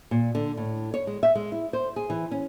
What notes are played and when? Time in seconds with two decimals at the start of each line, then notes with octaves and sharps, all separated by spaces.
0.11 A#2
0.35 D3
0.57 A2
0.94 C#5
1.07 G#3
1.23 E5
1.35 G#3
1.52 E4
1.73 C5
1.96 G#4
2.10 E3
2.31 C#4